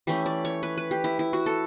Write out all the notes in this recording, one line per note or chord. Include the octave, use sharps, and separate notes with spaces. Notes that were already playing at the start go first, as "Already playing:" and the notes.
E3 A3 C#4 G4
D5
C#5
B4
B4
G4
E4
E4
F#4
A4